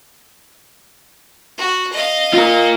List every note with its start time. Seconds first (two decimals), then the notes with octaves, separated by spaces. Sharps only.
1.58 F#4
1.92 D#5 F5
2.33 F4 A#4